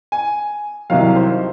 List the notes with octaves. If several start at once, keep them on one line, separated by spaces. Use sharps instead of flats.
G#5
C2 C3 D#3 F#3 F5
C5